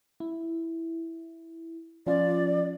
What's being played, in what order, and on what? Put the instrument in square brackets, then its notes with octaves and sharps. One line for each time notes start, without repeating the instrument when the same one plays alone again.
[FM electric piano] E4
[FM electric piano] F3 C#4 F4 [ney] D5